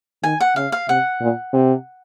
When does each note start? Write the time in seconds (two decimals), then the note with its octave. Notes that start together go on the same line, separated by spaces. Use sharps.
0.24 D#3 G#5
0.40 F#5
0.56 C#3 F5
0.72 F5
0.89 C3 F#5
1.21 A#2
1.53 C3